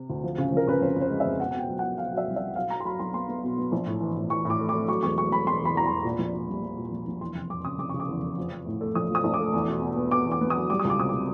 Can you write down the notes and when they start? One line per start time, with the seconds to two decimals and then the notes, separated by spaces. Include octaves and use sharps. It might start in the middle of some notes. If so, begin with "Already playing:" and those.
Already playing: C3
0.10 D2
0.24 F3
0.38 C#3
0.52 F3 A#4
0.67 C#3 B4
0.82 F2 C5
0.96 F2 C5
1.10 G#3
1.20 E5
1.25 F2
1.40 B2 F#5
1.51 F#5
1.54 B2 G5
1.69 F#3
1.79 B2 F#5
1.98 B2 F5
2.13 F#3 E5
2.27 C2
2.36 E5
2.42 F#3
2.56 B1 F5
2.70 F#3 A#5
2.80 C6
2.85 F#3 B5
2.99 B1 C6
3.14 B3 C6
3.29 B3
3.43 B2
3.58 B3
3.72 A#1
3.86 A2
4.01 E3
4.15 A2
4.30 E3 C#6
4.45 A2 D6
4.60 A3
4.69 D6
4.74 A3
4.88 F#3 C#6
5.03 E1 C#6
5.17 F#3 C#6
5.32 E1 B5
5.47 E1 C6
5.62 E2 B5
5.75 E2 A#5
5.86 E1 B5
6.04 A#2
6.19 A#1
6.34 A#2
6.49 G3
6.63 G3
6.77 A#2
6.92 A#1
7.07 A#1
7.21 E2 C6
7.35 F1
7.50 F1 D6
7.65 C#3 D#6
7.79 F1 D6
7.90 C#3 C#6
8.00 D6
8.09 E2
8.23 F1
8.38 F3
8.52 F3
8.66 A2
8.81 A3
8.95 A#1 D#6
9.10 F3 D#6
9.24 A#1
9.34 D6
9.40 A3
9.53 E2
9.67 B2
9.82 B2
9.97 B3
10.11 B3 D6
10.26 E2
10.32 D6
10.41 B3
10.50 F#3 D#6
10.70 G3 D6
10.80 C#2 D#6
10.90 D6
10.99 C3 D#6
11.09 C3 D6